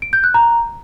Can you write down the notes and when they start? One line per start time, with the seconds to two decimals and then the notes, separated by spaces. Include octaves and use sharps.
0.02 D7
0.13 G6
0.24 F#6
0.34 A#5